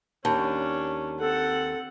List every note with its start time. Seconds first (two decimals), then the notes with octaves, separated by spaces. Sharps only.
0.25 D#2 C#4 D4 A5
1.19 C4 A4 F#5